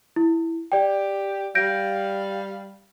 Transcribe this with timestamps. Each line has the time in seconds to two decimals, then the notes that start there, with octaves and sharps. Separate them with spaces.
0.16 E4
0.72 G4 D5 G5
1.55 G3 F5 G6 A#6 D7